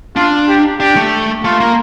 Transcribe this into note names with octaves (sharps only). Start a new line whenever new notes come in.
D4 F4
G4
D4 G4
A3
A3 F4
A#3